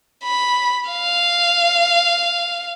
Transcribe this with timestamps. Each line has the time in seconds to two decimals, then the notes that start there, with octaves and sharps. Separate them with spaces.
0.23 B5
0.90 F5